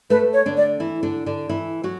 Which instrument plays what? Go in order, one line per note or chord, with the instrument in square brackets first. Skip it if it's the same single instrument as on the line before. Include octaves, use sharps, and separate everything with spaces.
[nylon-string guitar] A3 A4 [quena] B4
[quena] C#5
[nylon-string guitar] D3 D4
[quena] D5
[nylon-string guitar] E3 E4
D3 D4
D3 D4
E3 E4
F#3 F#4